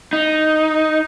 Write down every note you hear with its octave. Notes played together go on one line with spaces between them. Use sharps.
D#4